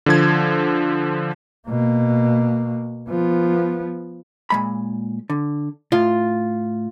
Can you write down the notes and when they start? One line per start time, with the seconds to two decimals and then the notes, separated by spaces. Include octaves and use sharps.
0.06 D3 F3 G#6
1.67 B2 A#3
3.09 F3 B3
4.50 A#2 G#3 B5
5.30 D3
5.92 A2 F4